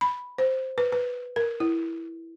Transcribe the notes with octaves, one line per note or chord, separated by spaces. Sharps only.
B5
C5
B4
B4
A#4
E4